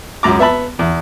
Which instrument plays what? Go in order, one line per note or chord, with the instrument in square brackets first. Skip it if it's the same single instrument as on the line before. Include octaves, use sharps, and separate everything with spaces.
[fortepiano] C#2 F#2 A#5 D6
B3 E5 A5 B5
E2